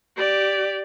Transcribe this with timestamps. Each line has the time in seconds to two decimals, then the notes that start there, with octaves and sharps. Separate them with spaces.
0.17 G4 D5